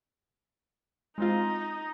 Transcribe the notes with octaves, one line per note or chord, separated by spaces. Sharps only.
G#3 C4 D#4 F4